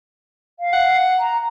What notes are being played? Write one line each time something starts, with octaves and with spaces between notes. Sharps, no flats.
F5
F#5
A#5